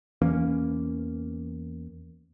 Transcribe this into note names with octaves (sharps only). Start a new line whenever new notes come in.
E2 E3 A#3 C#4